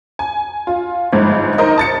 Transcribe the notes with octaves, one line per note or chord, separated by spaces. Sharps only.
G#5
F4
G1 G#2 F3
D#4 A#4 C5 D#5
A5 A6 C#7